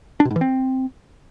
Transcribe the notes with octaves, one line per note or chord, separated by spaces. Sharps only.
D4
B2
G#2
E3
C4